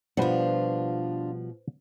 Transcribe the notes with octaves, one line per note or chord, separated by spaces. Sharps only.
B2 F3 G3 D4 F4 B4 C5 F#5